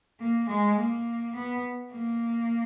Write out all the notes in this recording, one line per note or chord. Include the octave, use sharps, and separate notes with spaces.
A#3
G#3
A#3
B3
A#3